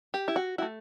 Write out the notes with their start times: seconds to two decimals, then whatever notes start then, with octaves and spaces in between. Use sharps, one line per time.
0.14 G4
0.28 E4
0.36 F#4
0.58 E4 F#4
0.62 A3